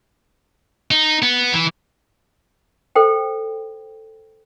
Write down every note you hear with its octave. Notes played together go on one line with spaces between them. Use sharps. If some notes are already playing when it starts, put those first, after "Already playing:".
D#4
B3
E3
A4 C5 G5